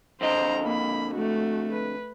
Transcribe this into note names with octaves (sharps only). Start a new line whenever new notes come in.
F2 D3 C5 D#5 A#5
A#3 B5
A3 F#4
B4